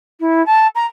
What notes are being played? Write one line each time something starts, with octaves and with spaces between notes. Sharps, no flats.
E4
A5
A#5